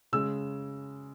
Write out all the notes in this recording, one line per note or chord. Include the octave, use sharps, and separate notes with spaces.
C#3 G#3 E6